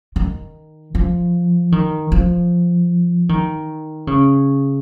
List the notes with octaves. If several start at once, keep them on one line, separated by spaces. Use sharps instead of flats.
D#3
F3
D#3
F3
D#3
C#3